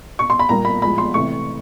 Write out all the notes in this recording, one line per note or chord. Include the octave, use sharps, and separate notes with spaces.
C#6
C6
B5
A#2 G3 A#3 A#5
B5
A2 F3 G#3 B5
C6
C3 E3 A3 C#6